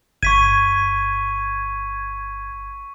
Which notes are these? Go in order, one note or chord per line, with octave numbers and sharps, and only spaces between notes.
G1 C#6 G#6 B6 D#7